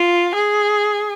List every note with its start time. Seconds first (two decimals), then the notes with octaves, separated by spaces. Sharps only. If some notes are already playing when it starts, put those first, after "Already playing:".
Already playing: F4
0.35 G#4